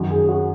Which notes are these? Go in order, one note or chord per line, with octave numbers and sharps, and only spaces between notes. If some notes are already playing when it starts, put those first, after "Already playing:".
Already playing: F#2 D#3 F#4
G#4
F#4